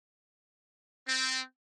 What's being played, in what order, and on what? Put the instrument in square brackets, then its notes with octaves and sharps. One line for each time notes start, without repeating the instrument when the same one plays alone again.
[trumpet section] C4